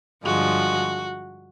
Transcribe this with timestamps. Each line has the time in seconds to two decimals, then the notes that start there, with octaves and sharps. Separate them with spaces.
0.24 G2 D3 F3 G#3 F#4